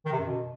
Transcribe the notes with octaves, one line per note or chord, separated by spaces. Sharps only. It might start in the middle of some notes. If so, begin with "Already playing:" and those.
D#3
C3
F#2
B2